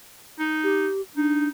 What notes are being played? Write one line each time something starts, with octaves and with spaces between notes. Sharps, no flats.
D#4
G4
D4 D#4